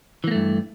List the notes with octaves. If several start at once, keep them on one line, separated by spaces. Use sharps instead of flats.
G2 E3 A3 A#3